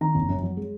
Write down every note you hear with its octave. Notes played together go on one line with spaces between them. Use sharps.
D#3 A#5
F#1
F#2
F#3
G#3